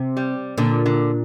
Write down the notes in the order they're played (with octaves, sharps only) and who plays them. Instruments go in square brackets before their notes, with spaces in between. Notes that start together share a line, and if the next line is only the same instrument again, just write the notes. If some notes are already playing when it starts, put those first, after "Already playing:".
Already playing: [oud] C3
[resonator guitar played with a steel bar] G3
[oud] A#2 [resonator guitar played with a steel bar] D3
[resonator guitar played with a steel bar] D3